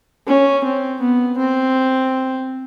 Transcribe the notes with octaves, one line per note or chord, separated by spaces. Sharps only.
C#4
C4
B3
C4